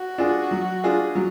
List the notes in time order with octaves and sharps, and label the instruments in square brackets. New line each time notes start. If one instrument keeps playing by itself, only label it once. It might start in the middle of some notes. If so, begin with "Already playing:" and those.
Already playing: [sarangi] F#4
[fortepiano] D4 F4 G#4
F#3
D4 F4 G#4
F#3